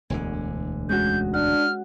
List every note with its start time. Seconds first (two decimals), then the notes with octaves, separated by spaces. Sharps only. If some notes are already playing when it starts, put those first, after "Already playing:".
0.10 E1 D2 D3 G#5
0.89 G#3 C#4 F#4 G6
1.34 D4 F#5 F6